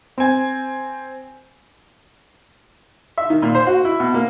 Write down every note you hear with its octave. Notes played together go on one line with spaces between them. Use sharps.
C4 G#5
E5
D#3
A#2
C5
F#4
E4
B2
A#3